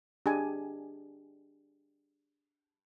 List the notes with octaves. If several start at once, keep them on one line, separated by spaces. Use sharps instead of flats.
D4 G4 G#4 D#5 G#5